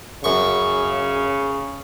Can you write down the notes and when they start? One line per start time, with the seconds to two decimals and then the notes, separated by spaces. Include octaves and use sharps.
0.24 F#2 C#3 C#6